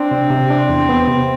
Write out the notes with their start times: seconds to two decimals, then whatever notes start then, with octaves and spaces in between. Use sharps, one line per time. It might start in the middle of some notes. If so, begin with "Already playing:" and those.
Already playing: C4 D4
0.11 C3
0.31 C3
0.50 D4
0.69 E2
0.89 B3
1.08 C3